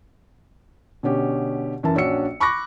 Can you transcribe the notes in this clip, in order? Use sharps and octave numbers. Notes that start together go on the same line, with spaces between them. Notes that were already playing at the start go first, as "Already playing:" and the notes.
B2 D3 C#4 G4
F#2 E3 A#4 A5
A#1 C#4 D4 F#4 E6 C#7
B5 C#6 D6 F#6 A#6